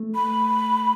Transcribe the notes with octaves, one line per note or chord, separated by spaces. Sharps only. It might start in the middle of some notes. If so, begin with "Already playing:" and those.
Already playing: A3
B5